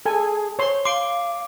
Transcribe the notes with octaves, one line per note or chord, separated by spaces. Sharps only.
G#4 A4 G#5
C5 C#5 C6
F5 C6 D6 D7